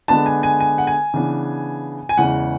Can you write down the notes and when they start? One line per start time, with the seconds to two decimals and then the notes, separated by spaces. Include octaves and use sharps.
0.08 D3 G#3 B3 D4 A5
0.26 G#5
0.43 G#5
0.60 G#5
0.78 F#5
0.87 G#5
1.14 C#3 E3 B3 D4
2.09 G#5
2.17 E2 C#3 E3 G#3 F#5